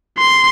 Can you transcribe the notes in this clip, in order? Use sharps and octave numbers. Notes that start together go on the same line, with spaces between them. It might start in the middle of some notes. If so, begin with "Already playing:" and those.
C6